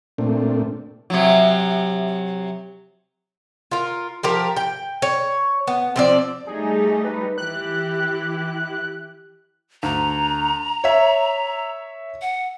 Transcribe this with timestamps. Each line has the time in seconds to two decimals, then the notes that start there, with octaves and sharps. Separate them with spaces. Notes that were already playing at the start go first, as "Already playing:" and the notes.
0.18 A#2 A3 C4 D4
1.10 C3 F#3
3.71 F4 A#4
4.23 F3 G4 A#4
4.56 G5
5.02 C#5
5.67 B3
5.96 F3 C4 D5
6.47 G3 A3 D#4 G#4
7.04 B4
7.38 E3 E4 G4 F#6
9.83 D2 A#5
10.84 C#5 E5
12.22 F#5